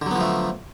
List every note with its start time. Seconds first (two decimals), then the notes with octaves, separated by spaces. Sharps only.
0.02 D3
0.06 F#3
0.11 B3
0.16 F3
0.20 A3